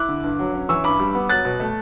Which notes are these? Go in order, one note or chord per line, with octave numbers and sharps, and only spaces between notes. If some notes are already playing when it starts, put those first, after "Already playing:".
Already playing: E4 D6 F#6
D3
G2
F#3
C#4
E3 C#6 E6
G2 B5 D6
G3
B3
F#3 F#6 A6
B2
A3